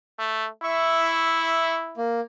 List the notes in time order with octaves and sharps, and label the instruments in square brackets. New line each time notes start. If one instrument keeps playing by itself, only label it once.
[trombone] A3
[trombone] E4 [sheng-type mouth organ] E5 C#6
[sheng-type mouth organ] A#3